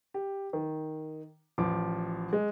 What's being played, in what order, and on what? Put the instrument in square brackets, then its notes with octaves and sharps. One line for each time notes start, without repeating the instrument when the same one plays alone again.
[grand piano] G4
D#3
A1 F3 D6
G#3